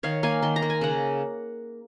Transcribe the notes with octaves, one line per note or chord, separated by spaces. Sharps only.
D#3 C#5 F5
A#3 F5 G#5
D#3 C6
A#5
A#3
G#5
C#3 F#5 A#5